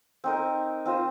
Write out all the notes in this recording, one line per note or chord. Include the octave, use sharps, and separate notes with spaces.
C4 D#4 A#4
C4 F4 C5 D#5